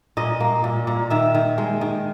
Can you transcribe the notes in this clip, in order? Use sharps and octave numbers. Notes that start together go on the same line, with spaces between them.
A#2 D#5
A#3
A#2
A#2
D#3 E5
D#3
G#3
D#3